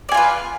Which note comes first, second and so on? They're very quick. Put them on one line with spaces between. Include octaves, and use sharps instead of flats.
D5 G#5 F4 B4